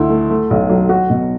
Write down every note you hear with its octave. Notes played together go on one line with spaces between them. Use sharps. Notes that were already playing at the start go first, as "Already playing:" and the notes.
Already playing: D2 E4
A3
A3
B1
F#3
F#4
B2